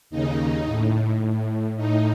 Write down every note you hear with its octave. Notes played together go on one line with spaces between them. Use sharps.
D#2 C#3 D#4
A2
A2
A2 D#4